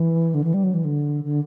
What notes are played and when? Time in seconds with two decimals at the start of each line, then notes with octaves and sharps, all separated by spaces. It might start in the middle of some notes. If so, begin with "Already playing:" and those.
Already playing: E3
0.34 D3
0.44 E3
0.54 G3
0.63 F#3
0.74 E3
0.84 D3
1.24 D3